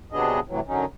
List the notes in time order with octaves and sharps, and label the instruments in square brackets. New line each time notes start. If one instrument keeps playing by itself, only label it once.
[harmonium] C3 F#3 B3 D4 G#4 D#5
A2 C3 E3 F#3
F#2 D3 F#3 C#4 D#4